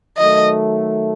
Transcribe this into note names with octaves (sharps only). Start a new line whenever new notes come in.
D#3 F#3 A3 D#5